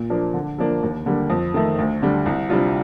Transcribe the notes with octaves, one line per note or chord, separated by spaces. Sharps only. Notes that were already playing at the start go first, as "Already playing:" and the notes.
Already playing: A#2
F3 A#3 D4
D3
F3 A#3 D4
D#2
D3 G3 A#3
F2
D#3 A3
D2
D3 G3
C2
C3 G3 D4 F4